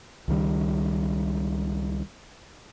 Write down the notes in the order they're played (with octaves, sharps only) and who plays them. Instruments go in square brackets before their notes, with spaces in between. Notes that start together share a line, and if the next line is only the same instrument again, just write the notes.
[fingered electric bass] C#2 D#3 G3